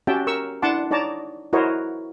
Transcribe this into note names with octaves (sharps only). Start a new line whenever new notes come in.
C#4 F#4 G4 E5 G5 A5
A#4 C#6 E6
D4 E4 F#5 A5 C6 D6
D#4 C#5 D5 A5 A#5 D6
E4 F#4 A#4 C5 C#5 D#5